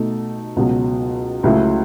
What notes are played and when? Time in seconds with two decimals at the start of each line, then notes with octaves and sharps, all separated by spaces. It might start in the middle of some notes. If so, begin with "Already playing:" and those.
Already playing: B2 A3 D#4 A4
0.56 C#2 B2 F#3
1.43 C#2 C#3 F#3 A3 E4